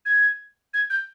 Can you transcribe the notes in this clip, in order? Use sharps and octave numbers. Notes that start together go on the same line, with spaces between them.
G#6
G#6
G6